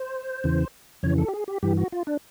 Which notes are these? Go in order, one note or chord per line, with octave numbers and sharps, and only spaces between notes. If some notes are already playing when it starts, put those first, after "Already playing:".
Already playing: C5
E2 C#3 E3
F2 C#3 E3 C#5
A4
G4
G#4
G4
G2 E3 G4
F#4
F4
D4